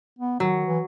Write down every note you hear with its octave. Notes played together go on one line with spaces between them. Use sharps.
B3
D#3 F#3
E3